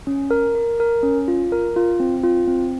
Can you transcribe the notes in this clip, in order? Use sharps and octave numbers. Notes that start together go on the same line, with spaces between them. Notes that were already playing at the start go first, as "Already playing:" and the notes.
C#4
A#4
A#4
A#4
C#4
F4
A#4
F4
C4
F4
C4